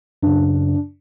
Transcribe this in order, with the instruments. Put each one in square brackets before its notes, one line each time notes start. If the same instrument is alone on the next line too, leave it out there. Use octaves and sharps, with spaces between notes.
[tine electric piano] F#2 C#3 [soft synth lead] D4